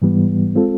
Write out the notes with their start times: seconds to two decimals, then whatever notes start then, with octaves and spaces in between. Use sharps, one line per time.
0.02 G#2 E3 G3 B3
0.55 G#3 C4 F4 A4